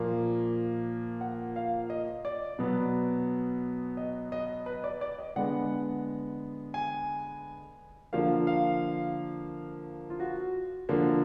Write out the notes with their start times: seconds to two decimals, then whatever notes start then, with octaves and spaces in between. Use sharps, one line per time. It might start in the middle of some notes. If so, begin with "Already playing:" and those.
Already playing: A#2 F3 A#3
1.21 F#5
1.56 F5
1.90 D#5
2.25 D5
2.59 B2 F#3 B3
3.97 D#5
4.32 D#5
4.66 B4
4.84 D5
5.01 D5
5.19 D#5
5.36 D3 G#3 B3 F#5
6.74 G#5
8.13 D3 F3 A#3 F5
8.47 F5
10.10 F4
10.20 F#4
10.89 D3 F3 A#3